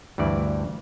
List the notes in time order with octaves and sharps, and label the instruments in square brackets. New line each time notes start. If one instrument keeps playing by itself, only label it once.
[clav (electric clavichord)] D2 G2 E3 D5